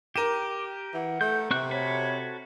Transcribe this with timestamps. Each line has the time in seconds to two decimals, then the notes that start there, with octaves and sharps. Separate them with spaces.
0.16 G4 A#4 D6 D#7 E7
0.94 E3 F#5
1.21 A3 G6
1.51 C3 C4 C#6 F#6
1.71 F#4 A4 C#5 B5